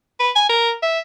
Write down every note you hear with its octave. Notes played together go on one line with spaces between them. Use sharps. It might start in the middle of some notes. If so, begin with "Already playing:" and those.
B4
G#5
A#4
E5